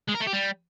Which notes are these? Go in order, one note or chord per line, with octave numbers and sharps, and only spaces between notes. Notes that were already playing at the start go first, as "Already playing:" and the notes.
G#3
A#4
A3
G4
G3